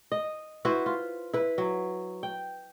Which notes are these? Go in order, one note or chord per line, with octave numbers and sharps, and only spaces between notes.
D#5
E4 F#4 B4 C5
F4
E4 B4
F#3
G5